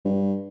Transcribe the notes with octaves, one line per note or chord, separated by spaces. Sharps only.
G2